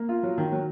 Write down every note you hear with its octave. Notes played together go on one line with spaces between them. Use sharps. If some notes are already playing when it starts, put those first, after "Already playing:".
Already playing: A#3
F4
F#3
D#3
F#3